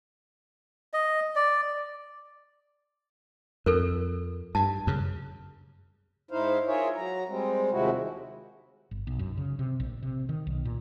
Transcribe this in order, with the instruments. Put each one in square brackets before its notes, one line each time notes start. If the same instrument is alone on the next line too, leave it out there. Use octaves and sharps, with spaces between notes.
[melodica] D#5
D5
[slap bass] F2 [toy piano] A4 A#4
[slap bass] G2 [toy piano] A5
[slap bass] F#2 C#3
[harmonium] G#2 D#4 E4 C5 F5
F4 G#4 A#4 C#5 E5
F#3 A#5
G3 G#3 C4
D#2 C3 F3 G#3 E4 F#4
[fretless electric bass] G1
B1
F#2
C#3
C3
A#1
C3
D#3
B1
A#2